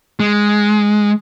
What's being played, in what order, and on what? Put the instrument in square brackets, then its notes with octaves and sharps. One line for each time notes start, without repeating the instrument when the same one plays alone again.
[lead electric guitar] G#3